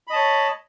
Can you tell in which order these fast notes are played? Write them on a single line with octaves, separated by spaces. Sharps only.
B5 D#5 A5 C#5